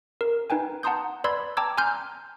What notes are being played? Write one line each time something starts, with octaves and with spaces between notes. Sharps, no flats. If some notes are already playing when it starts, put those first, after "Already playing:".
A#4
D#4 B4 G5 G#5
F#5 A5 A#5 C6 D#6 G6
B4 D5 B5 C6 E6 G#6
G5 A5 A#5 D6 E6 G#6
G#5 A#5 C6 F6 G6